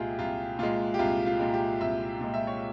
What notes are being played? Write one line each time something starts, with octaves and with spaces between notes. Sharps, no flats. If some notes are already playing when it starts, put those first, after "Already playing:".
Already playing: C2 A#2 G#3 F4 G4 G#4
C2 F4
A#2 G#3 F4
G4
C2 F4
F4
A#2 G#3
G4
C2 E5
A#2 G#3
E5
C#5